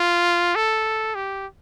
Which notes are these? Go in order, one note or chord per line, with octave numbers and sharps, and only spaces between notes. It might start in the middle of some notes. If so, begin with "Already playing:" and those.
Already playing: F4
A4
G4